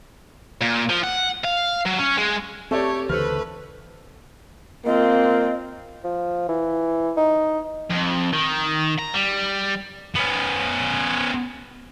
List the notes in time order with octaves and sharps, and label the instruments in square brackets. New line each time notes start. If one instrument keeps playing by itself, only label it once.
[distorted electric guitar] A#2
F3
F#5
F5
F#3
C#4
G#3
[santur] A3 [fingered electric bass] C4 [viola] G4 C#5 [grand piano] A4 D5
[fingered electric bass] D2 C#3 E3 [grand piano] A4 C5 F6 [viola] B4
[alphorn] A#3 [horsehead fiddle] C4 F4 [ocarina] D#5
[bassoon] F3
E3
D#4
[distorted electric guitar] F2
D#3
A#5
G3
B3 C#4